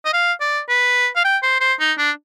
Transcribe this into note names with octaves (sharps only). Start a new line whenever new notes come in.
D#5
F5
D5
B4
F5
G5
C5
C5
D#4
D4